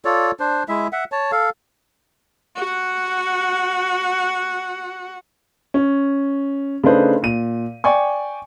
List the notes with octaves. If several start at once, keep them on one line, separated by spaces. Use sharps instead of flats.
F4 A4 C#5 D5
D4 C5
G#3 E4 E5
E5 F#5
C#5 A5
A4 F5
F#4 F#5
C#4
C#3 A3 D4 D#4 B4 C5
A#2 D#7
D5 G5 G#5 C#6